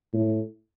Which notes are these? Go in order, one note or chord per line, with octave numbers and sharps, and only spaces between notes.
A2